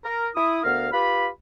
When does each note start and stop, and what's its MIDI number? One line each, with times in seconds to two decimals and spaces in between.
0.04 0.28 70
0.36 0.60 64
0.36 0.60 87
0.63 0.88 38
0.63 0.88 59
0.63 0.88 70
0.63 0.88 77
0.92 1.26 65
0.92 1.26 67
0.92 1.26 71
0.92 1.26 83